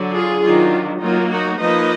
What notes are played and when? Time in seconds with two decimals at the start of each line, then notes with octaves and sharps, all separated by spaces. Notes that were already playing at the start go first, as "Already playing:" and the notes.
Already playing: D3 F#3 D4
0.14 F4 G#4
0.42 D#3 F#3 D4 F4
1.01 F#3 A#3 D#4 F4
1.30 D#4 F#4
1.59 F3 A#3 D#4 B4 D#5